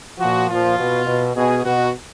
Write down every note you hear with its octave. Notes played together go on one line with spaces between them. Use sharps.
A#2 F3 F#4
A#2 F3 F4
B2
B2
B2 G#4
B2 F#4